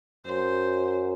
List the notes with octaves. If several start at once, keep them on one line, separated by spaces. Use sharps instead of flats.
F#2 C5